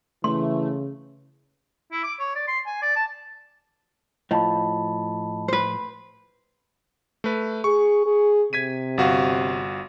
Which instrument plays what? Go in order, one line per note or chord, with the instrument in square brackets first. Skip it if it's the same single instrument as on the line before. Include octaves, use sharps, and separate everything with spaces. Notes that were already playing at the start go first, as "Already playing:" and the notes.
[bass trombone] C#3 [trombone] E3 [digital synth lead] A3 [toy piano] C6
[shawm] E4
D6
C#5
D5
C6
G#5
D5
A5
[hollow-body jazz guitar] A2 F3 [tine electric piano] D#5 A5 B5
[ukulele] B4 C5
[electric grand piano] A3 B4
[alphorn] G#4 [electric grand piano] C#6
[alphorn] G#4
[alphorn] C3 [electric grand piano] G#6 B6 D#7
[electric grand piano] G1 F#4 F5